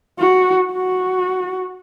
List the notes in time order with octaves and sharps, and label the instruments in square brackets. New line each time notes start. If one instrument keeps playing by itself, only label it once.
[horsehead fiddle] F#4
F#4